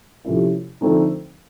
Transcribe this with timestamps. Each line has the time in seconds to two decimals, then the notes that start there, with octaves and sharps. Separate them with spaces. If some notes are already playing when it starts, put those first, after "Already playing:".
0.25 C3 F3 A3 C#4 E4
0.81 D3 F3 A3 C4 D#4